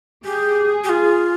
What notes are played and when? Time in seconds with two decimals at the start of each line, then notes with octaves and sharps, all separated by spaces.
0.24 G4 G#4
0.84 G4
0.89 F4